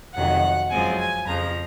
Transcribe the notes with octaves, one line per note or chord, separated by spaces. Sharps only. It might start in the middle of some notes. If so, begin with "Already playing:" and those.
F2 C3 D#3 F#3 C#4 F#5
F#2 F3 G#3 C4 G#5
G#5
F2 C#3 F3 A#5